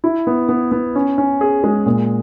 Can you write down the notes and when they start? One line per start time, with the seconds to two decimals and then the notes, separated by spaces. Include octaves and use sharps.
0.04 E4
0.27 B3
0.49 B3
0.72 B3
0.95 C#4
1.18 C#4
1.41 G#4
1.64 G#3
1.86 A#2